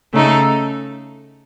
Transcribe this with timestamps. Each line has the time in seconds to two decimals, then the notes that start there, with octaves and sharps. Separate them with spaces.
0.13 C#3 A3 D#4 A4